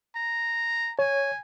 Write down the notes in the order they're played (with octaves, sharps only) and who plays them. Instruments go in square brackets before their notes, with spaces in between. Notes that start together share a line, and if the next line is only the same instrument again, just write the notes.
[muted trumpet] A#5
[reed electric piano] C#5 [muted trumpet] G#5